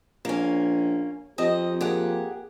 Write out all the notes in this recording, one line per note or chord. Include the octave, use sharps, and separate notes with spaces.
A#1 A#3 C#4
F2 C4 G4 D#5
A#3 G4 G#4 F#5